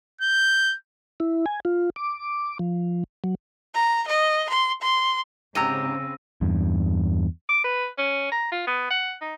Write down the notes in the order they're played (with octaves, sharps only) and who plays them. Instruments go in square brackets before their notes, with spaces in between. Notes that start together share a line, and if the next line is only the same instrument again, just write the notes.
[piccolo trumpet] G6
[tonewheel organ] E4
G#5
F4
D6
F3
F#3
[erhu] A#5
D#5
C6
C6
[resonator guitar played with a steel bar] G#2 G4 A#5 [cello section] C#3 C4 [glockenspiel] E6 A#6 D#7
[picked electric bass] E2 G2
[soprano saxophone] D6
B4
C#4
A#5
F4
B3
F#5
D#4